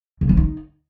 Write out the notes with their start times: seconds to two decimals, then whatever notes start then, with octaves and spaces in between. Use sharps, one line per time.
0.21 C#3
0.29 F3
0.37 D#4